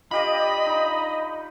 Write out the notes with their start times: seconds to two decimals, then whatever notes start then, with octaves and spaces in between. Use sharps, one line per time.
0.11 F4 G4 D5 D#5 B5
0.66 D#4